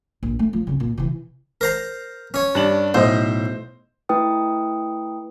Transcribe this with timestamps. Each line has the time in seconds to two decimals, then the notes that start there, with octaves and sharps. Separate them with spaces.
0.23 A#1
0.39 A3
0.53 F3
0.67 C2 C#3
0.80 A#2
0.98 C3 E3
1.61 A#4 C5 A#5
2.34 C#4 C#5
2.55 G2 D4 F#7
2.94 B1 A2 C5 D#5
4.09 A3 E4 B4 G5 D#6